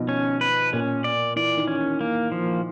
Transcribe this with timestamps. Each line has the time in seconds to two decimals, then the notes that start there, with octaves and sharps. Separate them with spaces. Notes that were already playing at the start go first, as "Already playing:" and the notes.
Already playing: B2 D#3 F3
0.09 C#4
0.41 B4
0.73 A#2 C#4
1.04 D5
1.36 E3 D5
1.57 D#3
1.68 C#4
2.01 A#3
2.32 F3